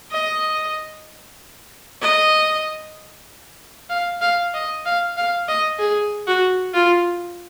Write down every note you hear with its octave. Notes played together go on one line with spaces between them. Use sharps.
D#5
D#5
F5
F5
D#5
F5
F5
D#5
G#4
F#4
F4